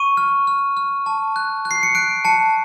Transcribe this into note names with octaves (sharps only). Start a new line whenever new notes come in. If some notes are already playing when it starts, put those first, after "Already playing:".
Already playing: C#6 D#7
F6
F6
F6
A5
F#6
F#6
C7
C#7
F#6 D7
A5 C#7